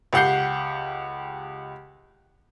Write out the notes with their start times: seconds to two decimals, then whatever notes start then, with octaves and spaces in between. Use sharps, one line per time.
0.13 C#2 G4 F#5 G6 C7